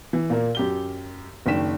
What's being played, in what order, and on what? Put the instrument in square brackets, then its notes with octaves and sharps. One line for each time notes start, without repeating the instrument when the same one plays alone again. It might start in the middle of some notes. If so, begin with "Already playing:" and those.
[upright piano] E3
A#2 A#3
F#2 G4 G7
F#1 D#3 D4 G5 B6 E7